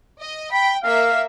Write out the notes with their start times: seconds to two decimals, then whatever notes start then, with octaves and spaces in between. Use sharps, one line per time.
0.18 D#5
0.52 G5 B5
0.83 A#3 E5 F5